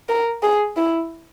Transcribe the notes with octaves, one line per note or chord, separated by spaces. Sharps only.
A#4
G#4
E4